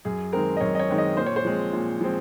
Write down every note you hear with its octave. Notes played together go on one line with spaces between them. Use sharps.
F#2 G#4
D#3 G#3 C4 A#4
D#5
F#2 C#5
D#5
C#5
D#3 G#3 C4
D#5
A#2 C5
C#5
C5
F3 G#3 C4
A#2
F3 G#3 C4